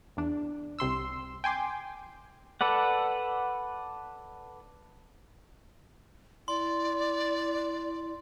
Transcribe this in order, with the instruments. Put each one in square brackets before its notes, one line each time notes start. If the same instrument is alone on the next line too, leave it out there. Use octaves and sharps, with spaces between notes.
[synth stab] E2 D4
C2 C3 C6 E6
G5 G#5 C6 D6
[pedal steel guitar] A4 B4 D5 F#5
[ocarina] E4 [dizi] D5 [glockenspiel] C6